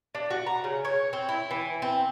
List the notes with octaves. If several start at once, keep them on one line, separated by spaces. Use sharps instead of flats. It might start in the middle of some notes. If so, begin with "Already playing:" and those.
D4
F#4
A#5
C#3
C#5
C4
E4
E3
C4